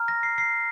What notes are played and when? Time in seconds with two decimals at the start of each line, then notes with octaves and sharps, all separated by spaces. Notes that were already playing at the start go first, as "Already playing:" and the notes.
Already playing: A#5 F6
0.08 A#6
0.23 C7
0.38 C7